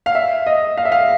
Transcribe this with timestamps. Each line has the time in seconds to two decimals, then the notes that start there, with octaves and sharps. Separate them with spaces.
0.06 F5
0.15 E5
0.46 D#5
0.77 F5
0.85 E5
0.92 F5